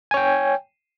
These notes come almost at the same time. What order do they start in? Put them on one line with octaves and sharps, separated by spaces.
G#5 C#5 G5